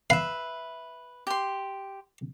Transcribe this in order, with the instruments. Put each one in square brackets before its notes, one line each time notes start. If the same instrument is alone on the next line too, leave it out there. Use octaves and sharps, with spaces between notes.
[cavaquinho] B4 E5 [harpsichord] F5
[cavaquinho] G4 C6